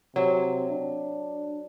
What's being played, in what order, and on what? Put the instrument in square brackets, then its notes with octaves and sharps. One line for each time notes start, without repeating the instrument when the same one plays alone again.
[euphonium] C3 [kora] F#3
[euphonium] D4